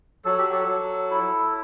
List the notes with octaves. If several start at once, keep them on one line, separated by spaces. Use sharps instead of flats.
F#3 A4
G4
A4
F#3
E4